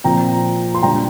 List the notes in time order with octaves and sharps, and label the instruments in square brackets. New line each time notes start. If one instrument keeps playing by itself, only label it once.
[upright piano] A#2 F3 C4 F4 G5 A#5
C6
A#2 G3 D4 G5 A#5